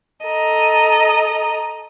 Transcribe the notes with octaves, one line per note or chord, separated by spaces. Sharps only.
A4 D#5 A#5